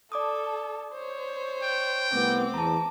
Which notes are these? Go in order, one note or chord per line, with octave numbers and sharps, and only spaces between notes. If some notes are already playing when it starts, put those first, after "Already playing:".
A4 D5 A5 D6 D#6
C5 C#5
G5
C2 A3 B3 C4 D6
E2 A5 A#5